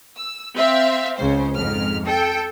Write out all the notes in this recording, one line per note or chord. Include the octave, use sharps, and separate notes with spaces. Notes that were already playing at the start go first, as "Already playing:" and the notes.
E6
C4 E5 F5
C#2 C#3 C5
F2 G#2 F6
A4 G5